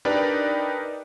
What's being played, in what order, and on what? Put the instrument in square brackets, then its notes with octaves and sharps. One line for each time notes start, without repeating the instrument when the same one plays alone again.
[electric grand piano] D4 D#4 G4 A#4 B4 D5